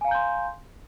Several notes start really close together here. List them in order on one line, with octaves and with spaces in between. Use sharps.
G#5 F5 A#5 G6 C6